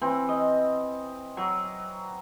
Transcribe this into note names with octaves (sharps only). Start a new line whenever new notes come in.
E3 C4
D#5
F#3